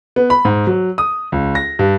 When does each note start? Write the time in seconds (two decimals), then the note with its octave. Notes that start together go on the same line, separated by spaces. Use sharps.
0.16 B3
0.30 B5
0.45 G#2
0.67 F#3
0.98 D#6
1.32 C#2
1.55 A#6
1.79 G2